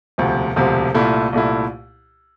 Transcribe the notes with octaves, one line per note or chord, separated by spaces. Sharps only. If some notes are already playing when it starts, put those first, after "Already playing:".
E1 D2 C3 F3
E1 D2 C3 F3
C2 A#2 A3 E4
C2 A#2 A3 E4